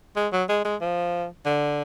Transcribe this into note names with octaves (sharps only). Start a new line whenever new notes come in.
G#3
F#3
G#3
G#3
F3
D3